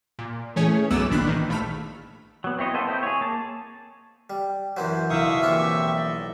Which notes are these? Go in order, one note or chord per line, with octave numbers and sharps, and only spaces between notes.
A#2
E3 A3 C#4 G#4 C#5
B1 F#2 B3 D6 E6 E7
G#1 A#2 D#3 D4 B5 F#6
D#3 E3
A#1 A3 B5 F6
F#3 B3
C4 E4 C#5 D#5
A#3 B3 A4 C5 D#5
C4 E4
G#4 C#5
A#3 A5
G3
F#2 E3 F#3 C5
B1 E4 E5 F5 C#6 D#6
A#1 E3 C4 F4 G4 C#6
D5 D#5